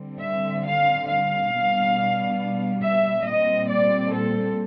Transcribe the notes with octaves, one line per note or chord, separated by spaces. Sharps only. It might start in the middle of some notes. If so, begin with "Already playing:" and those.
Already playing: D3 G3 C4
E5
F5
F5
B2 G3 B3 D4
E5
A#2 G3 C4 D#5
D5
A4